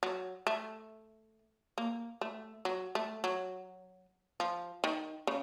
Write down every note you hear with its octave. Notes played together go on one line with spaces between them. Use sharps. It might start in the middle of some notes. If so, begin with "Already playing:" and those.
F#3
A3
A#3
A3
F#3
A3
F#3
F3
D#3
C#3